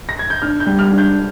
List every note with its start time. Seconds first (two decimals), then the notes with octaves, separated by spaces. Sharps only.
0.09 A#6
0.19 G#6
0.30 G6
0.42 D4 F6
0.60 G6
0.67 G3
0.79 F6
0.91 D4
0.98 G6